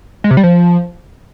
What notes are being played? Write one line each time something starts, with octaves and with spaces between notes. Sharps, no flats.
G#3
C3
G3
F3